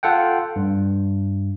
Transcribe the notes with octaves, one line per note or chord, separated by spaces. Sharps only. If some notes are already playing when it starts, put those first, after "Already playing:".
F4 A4 F#5 G5
G2